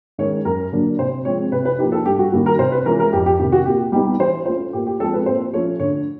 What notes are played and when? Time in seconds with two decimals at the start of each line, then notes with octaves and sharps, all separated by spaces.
0.18 D#3 G#3 C#4 C#5
0.45 F#2 A#4
0.73 D3 F#3 A#3 D4
0.99 C3 C5
1.25 F3 G#3 C4 C#5
1.52 C3 B4
1.65 B4
1.78 F3 A#3 D#4 G4
1.92 A4
2.05 G2 G4
2.19 F#4
2.32 D#3 G3 A#3 F#4
2.46 A#4
2.59 C3 C5
2.72 B4
2.86 E3 G#3 C#4 F4 A#4
3.00 A#4
3.13 F2 G4
3.26 G4
3.40 C3 D#3 G4
3.52 F#4
3.66 A#2 G4
3.92 G3 B3 D#4 G4
4.19 E3 C5
4.46 A3 C#4 F4 C5
4.73 A#2 G4
4.87 G4
5.00 F3 G#3 C4 A4
5.13 B4
5.26 A#2 C5
5.53 F3 A3 C#4 C#5
5.79 D3 C#5